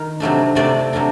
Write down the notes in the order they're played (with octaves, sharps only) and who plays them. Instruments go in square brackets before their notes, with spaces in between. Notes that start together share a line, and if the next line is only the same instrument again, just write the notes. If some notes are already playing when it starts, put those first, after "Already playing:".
Already playing: [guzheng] D#3 A#4
C3 F#3 A3 D4
C3 F#3 A3 D4 D5
C3 F#3 A3 D4